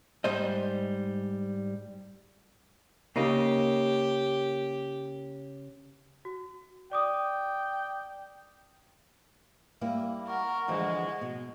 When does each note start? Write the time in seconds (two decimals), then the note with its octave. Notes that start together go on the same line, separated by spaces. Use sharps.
0.24 G#2 G3 C5 D#5
3.16 C#3 A#3 D#4 G4
6.25 F#4
6.91 D5 G5 D6 D#6
9.81 G3 A#3 E4 F5
10.27 A#4 F#5 C#6
10.68 D3 E3 F3 G#3
11.21 B2